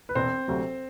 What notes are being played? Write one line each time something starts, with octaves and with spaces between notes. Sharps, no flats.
B4
E1 C4 C5
D2 C3 F#3